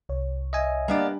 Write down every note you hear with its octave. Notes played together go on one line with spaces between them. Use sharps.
C2 C#5
D#5 E5 G#5
G3 A#3 B3 D4 D5